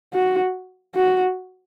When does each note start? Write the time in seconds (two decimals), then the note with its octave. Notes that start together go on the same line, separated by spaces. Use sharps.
0.13 F#4
0.95 F#4